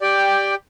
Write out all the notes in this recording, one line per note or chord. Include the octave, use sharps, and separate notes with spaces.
G4 D5 G5